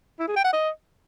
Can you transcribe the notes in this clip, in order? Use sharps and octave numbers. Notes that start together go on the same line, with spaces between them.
E4
G#4
G5
F#5
D#5